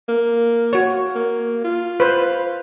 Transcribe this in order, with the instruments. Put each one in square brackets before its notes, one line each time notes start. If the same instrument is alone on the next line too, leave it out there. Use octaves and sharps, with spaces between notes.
[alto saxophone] A#3
[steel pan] F#4 C#5
[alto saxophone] A#3
F4
[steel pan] B4 C5